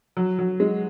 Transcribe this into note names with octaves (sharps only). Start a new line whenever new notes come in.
F#3
F#3
G#3